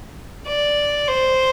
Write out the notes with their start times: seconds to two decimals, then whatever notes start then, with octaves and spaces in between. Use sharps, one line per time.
0.48 D5
1.08 C5